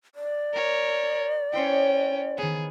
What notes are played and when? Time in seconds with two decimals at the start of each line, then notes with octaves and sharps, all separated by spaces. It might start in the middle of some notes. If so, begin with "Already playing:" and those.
0.15 D5
0.54 A#4 C#5
1.53 C#4 E4 C5 C#5 G5
2.38 D#3 B3 G#4